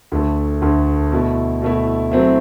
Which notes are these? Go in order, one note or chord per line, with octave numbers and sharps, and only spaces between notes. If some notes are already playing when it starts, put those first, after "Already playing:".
D2 D3 A3
D2 D3 A3
B2 A3 E4
B2 A3 E4
F#3 A3 C4 E4